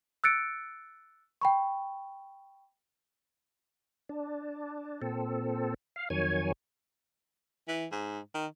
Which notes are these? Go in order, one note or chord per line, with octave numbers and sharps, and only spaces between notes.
E6 F#6 A6 C#7 D7
G5 B5 C#6
D4
A#2 C4 A4
F5
F2 D#3 F#3 C#5 G#5
E3
G#2
D#3